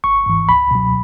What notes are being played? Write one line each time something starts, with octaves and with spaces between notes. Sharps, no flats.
G#1 C#6
G#2 E3
C#2 B5
B2 F#3